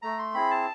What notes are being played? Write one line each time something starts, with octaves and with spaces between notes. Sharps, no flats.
A3 A#5
C6
C4 E4 G#4 B5
A5